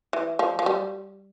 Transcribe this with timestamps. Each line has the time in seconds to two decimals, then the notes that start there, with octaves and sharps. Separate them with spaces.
0.13 E3
0.39 F3
0.59 F3
0.66 G3